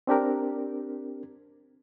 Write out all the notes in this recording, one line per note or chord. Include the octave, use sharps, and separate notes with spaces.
C4 D4 G4 A#4